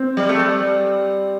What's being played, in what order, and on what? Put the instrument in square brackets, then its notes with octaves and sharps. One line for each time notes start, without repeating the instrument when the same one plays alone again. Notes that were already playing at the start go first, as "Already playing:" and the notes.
Already playing: [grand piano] C4
[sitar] G3
A3
G3